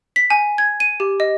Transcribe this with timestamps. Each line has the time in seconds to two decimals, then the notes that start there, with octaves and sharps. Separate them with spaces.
0.16 B6
0.30 G#5
0.58 G#6
0.80 D#7
1.00 G4
1.20 D#5